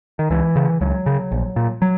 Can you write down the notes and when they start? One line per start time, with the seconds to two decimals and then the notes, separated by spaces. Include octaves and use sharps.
0.19 D#3
0.30 C#2 E3
0.56 C#3
0.81 C#2 F#3
1.06 C#3
1.32 A#1
1.56 A#2
1.82 F#3